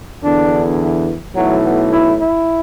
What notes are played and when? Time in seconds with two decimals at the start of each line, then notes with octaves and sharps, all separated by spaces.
0.22 E2 D3 D4
0.79 E3
1.36 B1 A2 E3 F#3
1.64 B3
1.93 E4
2.20 E4